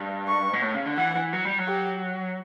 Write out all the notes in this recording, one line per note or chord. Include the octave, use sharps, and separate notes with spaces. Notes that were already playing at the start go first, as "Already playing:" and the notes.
Already playing: G2
C#6
B2
A2
C#3
D3
E3 F#5
E3
F#3
G3
F#3
G4